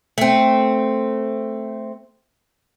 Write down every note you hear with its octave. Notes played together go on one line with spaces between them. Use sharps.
A3 C4